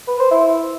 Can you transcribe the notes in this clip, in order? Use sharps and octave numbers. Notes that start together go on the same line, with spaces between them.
B4
C5
E4